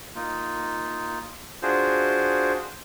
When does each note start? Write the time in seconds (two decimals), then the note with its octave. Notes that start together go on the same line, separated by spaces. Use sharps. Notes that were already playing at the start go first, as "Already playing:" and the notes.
0.15 A#3 D#4 F4
1.62 D4 F4 F#4 G#4 C5